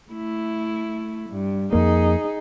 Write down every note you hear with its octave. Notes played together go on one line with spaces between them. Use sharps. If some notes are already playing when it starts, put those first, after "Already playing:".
A3 E4
G2
F2 A#3 D#4 G#4